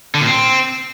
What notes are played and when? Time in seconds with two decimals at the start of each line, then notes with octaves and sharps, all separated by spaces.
0.15 D3
0.21 A#2
0.27 C4